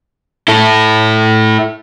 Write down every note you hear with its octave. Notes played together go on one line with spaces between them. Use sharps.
E4 A4